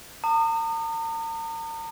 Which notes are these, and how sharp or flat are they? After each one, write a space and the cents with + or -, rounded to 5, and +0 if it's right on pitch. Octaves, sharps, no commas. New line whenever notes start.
A#5 -45 D#6 -35